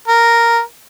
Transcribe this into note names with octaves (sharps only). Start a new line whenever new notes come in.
A#4